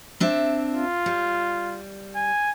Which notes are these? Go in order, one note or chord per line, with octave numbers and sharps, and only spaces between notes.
C4 D4 E5
F4
G3
G#5